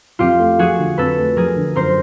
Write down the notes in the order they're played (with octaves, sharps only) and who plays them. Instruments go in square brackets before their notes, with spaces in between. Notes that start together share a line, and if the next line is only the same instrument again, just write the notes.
[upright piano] F2 [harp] F4 G4
[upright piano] A3
[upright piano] F3 [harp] F#4 G#4
[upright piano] D3
[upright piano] F2 [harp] A4 B4
[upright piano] A3
[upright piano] F3 [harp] G#4 A#4
[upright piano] D3
[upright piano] F#2 [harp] A#4 C5